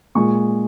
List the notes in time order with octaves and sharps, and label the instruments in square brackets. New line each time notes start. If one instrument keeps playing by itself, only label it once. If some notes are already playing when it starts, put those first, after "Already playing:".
[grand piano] A#2 G#3 C#6